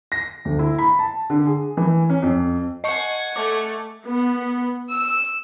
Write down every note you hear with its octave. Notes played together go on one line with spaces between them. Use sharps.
A#6
D2
E4
B5
A5
D3
G#4
E3
C#4
F2
D#5 F#5 G#5 C#6 C#7
A3 A4 D6
B3
E6